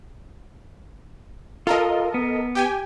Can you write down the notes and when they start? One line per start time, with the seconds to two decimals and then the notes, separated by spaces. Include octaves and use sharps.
1.67 F4 A4 A#4 D#5
2.14 B3
2.55 G4 G5 G#5